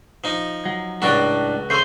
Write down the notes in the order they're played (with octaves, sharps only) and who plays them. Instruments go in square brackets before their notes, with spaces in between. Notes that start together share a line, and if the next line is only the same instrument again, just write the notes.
[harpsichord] F3 D#4
[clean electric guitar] F#3
[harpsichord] C#2 F#3 F#4 [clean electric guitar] A2 D4 D5
[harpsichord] C#3 A3 [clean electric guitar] C5 C6